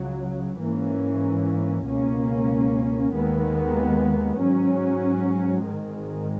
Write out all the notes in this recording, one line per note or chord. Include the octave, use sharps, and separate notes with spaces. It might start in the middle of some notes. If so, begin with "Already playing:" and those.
Already playing: C#2 C#3 F#3
G#2 E3 A#3 C#4
C#2 B2 A#3 C#4
D#2 D#3 G#3 B3
G#2 F#3 C#4
G#1 G#2 D#3 G#3